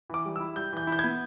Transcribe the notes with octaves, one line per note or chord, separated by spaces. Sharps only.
E3 D6
G3
E6
E4
G3 G6
E3 G6
E4
G6
G#6
B3